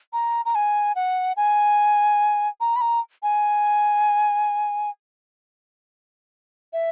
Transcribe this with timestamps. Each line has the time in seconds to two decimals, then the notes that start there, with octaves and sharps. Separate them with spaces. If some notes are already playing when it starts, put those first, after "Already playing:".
0.13 A#5
0.45 A#5
0.55 G#5
0.95 F#5
1.37 G#5
2.60 A#5
2.76 B5
2.81 A#5
3.23 G#5
6.73 E5